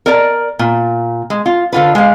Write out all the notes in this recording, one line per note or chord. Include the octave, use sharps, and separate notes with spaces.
A#4 D5 A#5
A#2
G#3
F4
D3 F4 B4
G#3 F5